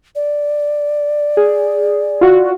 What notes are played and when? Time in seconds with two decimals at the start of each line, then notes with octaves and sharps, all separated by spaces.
0.15 D5
1.37 G#4
2.21 F4 F#4